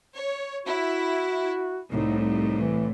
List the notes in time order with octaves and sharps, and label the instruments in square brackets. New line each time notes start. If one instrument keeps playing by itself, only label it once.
[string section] C#5
[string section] E4 [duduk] F#4
[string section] C2 A2 [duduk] D#4
[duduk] D#4
E3